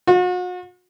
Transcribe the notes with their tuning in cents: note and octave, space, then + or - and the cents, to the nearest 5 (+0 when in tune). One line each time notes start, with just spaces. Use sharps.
F#4 -40